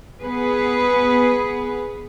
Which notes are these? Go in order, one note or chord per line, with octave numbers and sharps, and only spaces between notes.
B3 G#4 B4